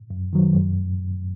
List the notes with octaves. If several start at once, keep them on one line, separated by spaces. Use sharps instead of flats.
F#2
D#3 F#3
F#2